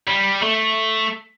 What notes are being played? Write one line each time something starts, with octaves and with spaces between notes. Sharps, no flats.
G3
A3